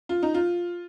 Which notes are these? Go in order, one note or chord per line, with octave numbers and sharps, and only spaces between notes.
F4
D#4
F4